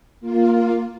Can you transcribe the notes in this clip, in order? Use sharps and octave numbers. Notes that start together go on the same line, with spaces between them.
A#3 F4